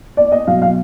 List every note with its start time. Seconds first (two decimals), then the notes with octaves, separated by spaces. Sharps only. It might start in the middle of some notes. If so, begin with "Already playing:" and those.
0.17 D5
0.32 D#5
0.47 B2 F#3 F5
0.62 F5